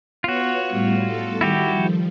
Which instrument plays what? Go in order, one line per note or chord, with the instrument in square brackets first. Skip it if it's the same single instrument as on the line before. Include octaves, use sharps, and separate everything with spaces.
[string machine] B3 C#5 [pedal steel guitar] F4 F#4
[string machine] A2 G3
A4
[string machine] D#3 G3 [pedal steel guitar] E4 F#4 G4
[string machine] F3